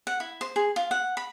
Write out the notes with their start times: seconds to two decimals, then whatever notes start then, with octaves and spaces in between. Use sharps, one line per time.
0.07 F#5
0.20 E4
0.41 C5
0.56 G#4
0.76 F4
0.91 F#5
1.17 B5